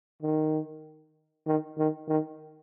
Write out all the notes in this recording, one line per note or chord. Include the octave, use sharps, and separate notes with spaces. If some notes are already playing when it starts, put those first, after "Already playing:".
D#3
D#3
D#3
D#3